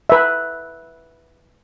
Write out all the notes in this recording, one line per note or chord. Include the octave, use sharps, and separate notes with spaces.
B4 E5